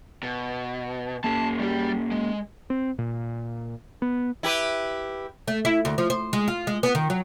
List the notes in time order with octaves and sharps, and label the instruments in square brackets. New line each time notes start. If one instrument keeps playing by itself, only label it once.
[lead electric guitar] B2
[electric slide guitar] A#3 C#4 G#4 [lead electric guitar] A5
[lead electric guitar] G3 G4
G#3
[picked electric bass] C4
A#2
B3
[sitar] E4 G4 B4
[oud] A3
E4
D2
F3
C5
G#3
F4
G#3
B3
D#3
F#3